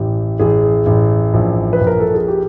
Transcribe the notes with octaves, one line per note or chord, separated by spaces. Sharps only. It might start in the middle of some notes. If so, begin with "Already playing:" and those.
Already playing: A1 G4
A1 G#4
A1
A#1
B4
A#1
A#4
A4
G#4
G4